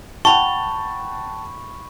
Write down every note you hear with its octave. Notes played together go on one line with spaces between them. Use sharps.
F#5 G5 A5 B5 C#6